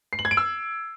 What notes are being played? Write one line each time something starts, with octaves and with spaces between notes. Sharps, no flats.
C7
F#7
G#6
D7
E6